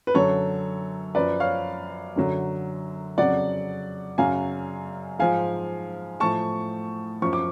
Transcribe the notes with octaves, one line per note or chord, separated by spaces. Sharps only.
B4
F#2 D3 F#3 A4 C#5
F#2 F3 B4 D5
C#5 F5
F#2 D3 F#3
F2 C#3 F#3 D5 F#5
F#2 C#3 F#3 F5 G#5
G#2 F3 F5 G#5
A2 F3 A5 C#6
F#2 F3 C#6
D6